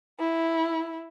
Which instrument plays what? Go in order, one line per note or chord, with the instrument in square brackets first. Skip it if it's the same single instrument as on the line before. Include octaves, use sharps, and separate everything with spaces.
[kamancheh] E4